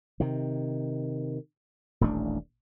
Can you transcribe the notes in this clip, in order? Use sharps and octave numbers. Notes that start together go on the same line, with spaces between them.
C3 D#3
D#1 A1 A3 D4